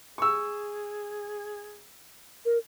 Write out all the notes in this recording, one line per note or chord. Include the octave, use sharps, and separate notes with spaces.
G#4 C#6 E6
A#4